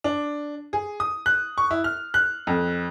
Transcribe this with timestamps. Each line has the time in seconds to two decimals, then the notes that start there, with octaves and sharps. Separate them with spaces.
0.04 D4
0.73 G#4
1.00 D#6
1.26 F#6
1.58 C#6
1.71 E4
1.84 F6
2.14 F#6
2.47 F2